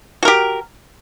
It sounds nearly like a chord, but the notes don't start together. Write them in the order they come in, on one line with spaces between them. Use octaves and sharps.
F#4 A#4 G4